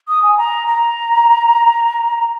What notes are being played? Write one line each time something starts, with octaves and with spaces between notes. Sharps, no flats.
D#6
G#5
A#5
A#5